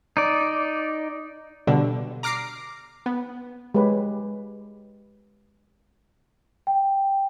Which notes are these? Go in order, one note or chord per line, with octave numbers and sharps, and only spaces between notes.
D#4 D5
B2 D3 G3 D4
A#5 D6 F6 A#6 C7 D7
B3
G#3 G4 B4 C#5
G5